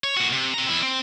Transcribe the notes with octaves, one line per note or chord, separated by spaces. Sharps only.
C#5
A#2 F#4
C3
C4 A#5
E2 E4
C4